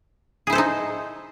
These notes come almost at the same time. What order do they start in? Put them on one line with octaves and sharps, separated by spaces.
G#4 E4 C5 A4 D#4